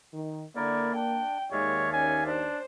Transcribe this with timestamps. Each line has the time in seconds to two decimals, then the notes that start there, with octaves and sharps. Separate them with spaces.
0.13 D#3
0.56 D3 A#3 E4 A#4 D5
0.95 D4 G5
1.52 D#2 D#3 G#3 C#5 D5 E5 F5
1.93 C#4 G#5
2.26 D4 C5